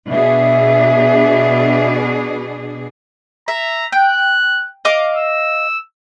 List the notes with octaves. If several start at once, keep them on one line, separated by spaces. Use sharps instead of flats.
B2 D4 G#4 E5
E5 A#5
G5 F#6
D#5 F5 D6
E6